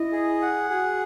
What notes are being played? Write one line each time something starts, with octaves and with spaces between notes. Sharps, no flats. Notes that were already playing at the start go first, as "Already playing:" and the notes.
Already playing: E4 D#5
G#4
F#5
F#4 G#4